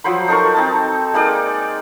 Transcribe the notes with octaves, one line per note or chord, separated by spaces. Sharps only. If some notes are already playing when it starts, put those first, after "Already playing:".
F3 F#3 C5 B5
D#4 A4 A#4 C#6
C4 D#4 A5
G#3 A#3 D#4 D5